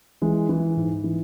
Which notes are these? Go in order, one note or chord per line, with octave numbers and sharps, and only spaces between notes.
E3 G#3
E3
G#2
E3